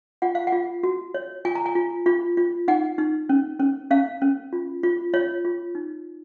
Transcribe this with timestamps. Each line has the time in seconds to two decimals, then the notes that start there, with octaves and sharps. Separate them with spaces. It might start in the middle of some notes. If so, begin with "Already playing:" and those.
0.22 F4 F#5
0.35 F5
0.47 F#5
0.52 F4
0.83 F#4
1.14 C#5
1.45 F4 G#5
1.55 A#5
1.66 G#5
1.75 F4
2.06 F4
2.37 F4
2.68 D#4 F#5
2.98 D#4
3.29 C#4
3.60 C#4
3.91 C#4 F5
4.22 C#4
4.53 F4
4.83 F4
5.14 F4 C#5
5.45 F4
5.75 D#4